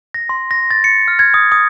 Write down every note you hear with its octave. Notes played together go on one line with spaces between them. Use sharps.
A#6
C6
A#6
A6
C#7
F6
G#6
D#6
D#6